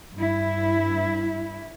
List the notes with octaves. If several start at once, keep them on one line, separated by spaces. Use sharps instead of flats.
G2 E4